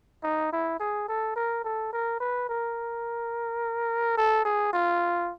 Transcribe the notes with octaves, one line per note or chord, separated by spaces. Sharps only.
D#4
E4
G#4
A4
A#4
A4
A#4
B4
A#4
A4
G#4
F4